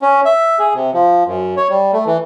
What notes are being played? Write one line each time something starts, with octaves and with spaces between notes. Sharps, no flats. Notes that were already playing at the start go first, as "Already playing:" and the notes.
C#4
E5
G#4
C3
F3
F#2
C#5
G3
A3
E3